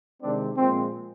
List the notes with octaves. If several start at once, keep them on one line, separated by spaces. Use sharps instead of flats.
C3 D#3 G#3 C4 D4
A#2 F3 G#3 C4